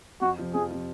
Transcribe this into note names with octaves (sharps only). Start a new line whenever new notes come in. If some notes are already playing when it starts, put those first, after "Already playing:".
F2 F#4
C3 F3
F2 G#4
C3 F3